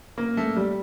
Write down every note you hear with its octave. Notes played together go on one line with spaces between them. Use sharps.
A#3
A3
G3